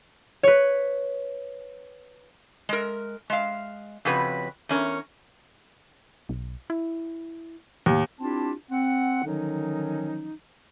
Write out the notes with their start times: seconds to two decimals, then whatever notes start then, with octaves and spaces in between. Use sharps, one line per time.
0.43 B4 C#5
2.69 G#3 A#4
3.30 G#3 F5
4.05 F2 C#3 F#4 B4
4.69 E2 C#4 A#4
6.29 B1
6.70 E4
7.86 D#2 A2
8.20 C4 D4 E4 F4 G4 A5
8.71 C4 F#5
9.25 D3 D#3 F3 F#3 C#4 D#4